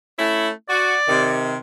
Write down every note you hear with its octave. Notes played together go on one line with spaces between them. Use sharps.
A3 C#4 E4
F#4 D5
C3 D#3